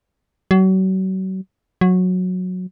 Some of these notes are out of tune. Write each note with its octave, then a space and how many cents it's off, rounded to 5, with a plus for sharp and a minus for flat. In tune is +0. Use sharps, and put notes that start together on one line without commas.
F#3 +35
F#3 -15